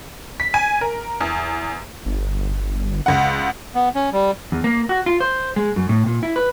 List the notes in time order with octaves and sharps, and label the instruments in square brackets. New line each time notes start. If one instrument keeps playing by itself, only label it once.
[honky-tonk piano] B6
G#5
A#4
E2
[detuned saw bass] G1
[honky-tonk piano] C#2 F#5
[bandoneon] B3
C#4
G3
[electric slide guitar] E2
A#3
F#4
F4
C5
G#3
F#2
A2
A#2
E4
B4